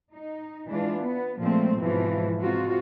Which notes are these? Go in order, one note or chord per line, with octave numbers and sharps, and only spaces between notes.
D#4
E3 G#3 D4 F4
B3
A#2 F3 G#3 A3 C4
G#2 B2 E3 F3
C3 G#3 F4 F#4